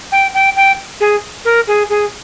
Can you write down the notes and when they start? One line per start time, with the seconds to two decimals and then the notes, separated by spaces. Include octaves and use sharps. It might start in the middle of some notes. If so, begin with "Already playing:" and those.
0.12 G5
0.34 G5
0.57 G5
1.01 G#4
1.45 A#4
1.68 G#4
1.90 G#4